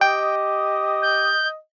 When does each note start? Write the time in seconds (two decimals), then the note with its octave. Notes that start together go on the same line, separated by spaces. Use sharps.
0.01 G4 D#5 G5
1.02 G6